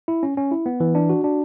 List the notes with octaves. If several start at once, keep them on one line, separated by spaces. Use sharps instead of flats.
E4
C#4
C#4
E4
B3
E3
D4
F#4
D4